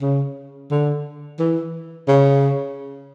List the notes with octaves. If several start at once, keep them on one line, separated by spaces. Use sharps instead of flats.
C#3
D3
E3
C#3